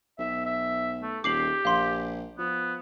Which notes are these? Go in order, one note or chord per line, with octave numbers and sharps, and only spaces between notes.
B1 E5
E5
A3
D#1 G4 D6 C7 F#7
A#1 F5 C6
F3 B3